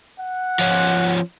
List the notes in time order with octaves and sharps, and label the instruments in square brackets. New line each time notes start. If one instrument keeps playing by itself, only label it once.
[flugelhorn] F#5
[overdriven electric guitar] F3 C#4